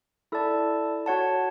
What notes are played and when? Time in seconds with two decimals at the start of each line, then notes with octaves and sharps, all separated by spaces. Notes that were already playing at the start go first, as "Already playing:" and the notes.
0.32 E4 A4 D5 A5
1.06 F#4 C#5 F#5 A5